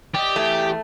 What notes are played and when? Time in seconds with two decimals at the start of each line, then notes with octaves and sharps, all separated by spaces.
0.15 G4 D5 D#5
0.36 E3 A3 G#4